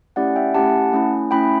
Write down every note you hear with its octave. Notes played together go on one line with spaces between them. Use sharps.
A3 C#4 E4 G4 D5 F#5
E5 G5
A3 C#4 E4 G4 F#5 A5
A3 C#4 E4
A3 C#4 E4 G5 B5